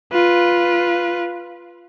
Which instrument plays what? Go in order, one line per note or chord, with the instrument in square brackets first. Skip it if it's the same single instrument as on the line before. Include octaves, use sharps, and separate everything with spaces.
[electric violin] F4 B4